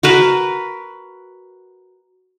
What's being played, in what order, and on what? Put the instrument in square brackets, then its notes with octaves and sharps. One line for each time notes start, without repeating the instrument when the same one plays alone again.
[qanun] F#4 A#4 B4